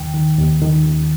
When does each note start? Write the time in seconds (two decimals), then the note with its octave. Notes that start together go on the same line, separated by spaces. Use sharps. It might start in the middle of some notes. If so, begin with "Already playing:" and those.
Already playing: D#2 D#3 G5
0.14 D#3
0.38 D#2
0.62 D#3
0.86 D#2